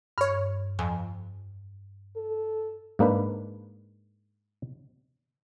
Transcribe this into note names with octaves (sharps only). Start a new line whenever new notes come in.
G2 C#5 F6
F2 G#5
A4
G#2 A#3 D4 B4